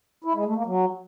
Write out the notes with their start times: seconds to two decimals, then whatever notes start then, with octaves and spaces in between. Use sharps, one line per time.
0.24 E4
0.35 G#3
0.45 A3
0.55 A#3
0.66 F#3